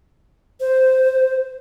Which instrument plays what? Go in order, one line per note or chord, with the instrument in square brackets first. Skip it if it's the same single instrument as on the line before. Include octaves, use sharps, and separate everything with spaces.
[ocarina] C5